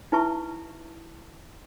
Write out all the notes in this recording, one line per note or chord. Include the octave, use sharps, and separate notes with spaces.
D#4 E4 B4 E5 A5 C#6